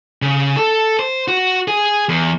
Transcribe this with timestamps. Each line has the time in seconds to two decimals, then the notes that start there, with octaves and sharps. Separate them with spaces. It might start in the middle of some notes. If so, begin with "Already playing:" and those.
0.22 C#3
0.57 A4
0.99 C5
1.28 F#4
1.68 G#4
2.09 E2